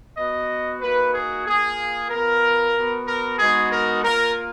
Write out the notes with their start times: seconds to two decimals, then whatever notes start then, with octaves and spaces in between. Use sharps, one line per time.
0.17 B3 F#4 D#5
0.82 A#3 D#4 F#4 B4
1.14 G#4
1.46 A#3 F4 G#4
2.10 B3 F4 A#4
2.75 B3 F#4
3.07 A#4
3.39 G#3 B3 D#4 F#4 G#4
3.72 A#4
4.04 A#3 F4 A#4